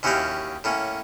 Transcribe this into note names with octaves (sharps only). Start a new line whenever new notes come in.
D#2 C#4 E4 F#4 G4 F5
A2 A#3 C#4